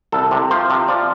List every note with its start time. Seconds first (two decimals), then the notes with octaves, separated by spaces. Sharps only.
0.12 C2 A4
0.31 C3
0.51 F3 C5
0.70 C3
0.88 F3 D5